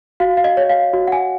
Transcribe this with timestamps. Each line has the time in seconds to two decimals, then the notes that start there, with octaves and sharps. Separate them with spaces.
0.20 F#4 F5
0.37 F5
0.44 D#5
0.57 C#5
0.69 F5
0.93 F#4
1.08 F#5
1.12 G#5